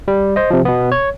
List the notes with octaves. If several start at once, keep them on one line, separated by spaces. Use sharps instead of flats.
G3
C5 D#5
C3 F3
B2 B3
C#5